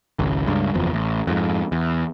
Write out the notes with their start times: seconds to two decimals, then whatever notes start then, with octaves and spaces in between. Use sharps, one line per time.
0.19 G#1 C#2
0.47 C#2 G2
0.74 F#1 E2 F3
0.93 A1
1.27 F2 G#2
1.72 E2